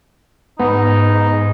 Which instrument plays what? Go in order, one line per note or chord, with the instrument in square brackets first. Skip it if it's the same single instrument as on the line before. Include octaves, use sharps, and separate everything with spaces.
[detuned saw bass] G#2 [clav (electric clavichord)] B3 [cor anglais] D#4